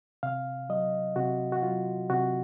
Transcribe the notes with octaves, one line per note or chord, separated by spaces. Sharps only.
C3 F5
F#3 D#5
C3 F#4
F#4
F#3 F4
C3 F#4